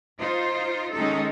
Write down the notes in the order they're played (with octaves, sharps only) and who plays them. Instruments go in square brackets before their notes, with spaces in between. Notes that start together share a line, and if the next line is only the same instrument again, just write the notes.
[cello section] D#4 F4 C5
D#3 G#3 C#4 D#4 A4